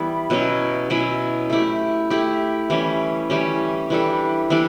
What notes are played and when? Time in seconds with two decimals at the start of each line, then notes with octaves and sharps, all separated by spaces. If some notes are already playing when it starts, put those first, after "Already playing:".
Already playing: E3 G3 B3 E4
0.30 B2 F#3 C#4 E4
0.90 B2 F#3 C#4 E4
1.50 A3 E4 G4
2.10 A3 E4 G4
2.70 E3 G3 C#4
3.30 E3 G3 C#4
3.90 E3 G3 D4 A4
4.50 E3 G3 D4 A4